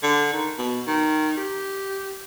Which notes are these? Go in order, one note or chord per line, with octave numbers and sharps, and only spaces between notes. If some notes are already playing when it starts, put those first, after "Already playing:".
D3
D#3
B2
D#3
G4